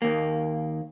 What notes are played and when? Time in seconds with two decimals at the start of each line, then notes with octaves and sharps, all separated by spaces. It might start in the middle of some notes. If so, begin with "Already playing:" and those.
0.02 D#2 A#3